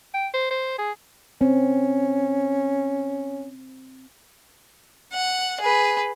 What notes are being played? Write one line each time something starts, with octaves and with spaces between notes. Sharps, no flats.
G5
C5
C5
G#4
C4 C#4
F#5
G#4 B4